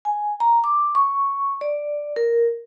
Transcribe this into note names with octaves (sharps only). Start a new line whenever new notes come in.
G#5
A#5
D6
C#6
D5
A#4